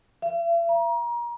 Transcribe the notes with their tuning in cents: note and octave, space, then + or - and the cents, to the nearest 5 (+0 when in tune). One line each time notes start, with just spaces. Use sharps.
E5 +45
A#5 +30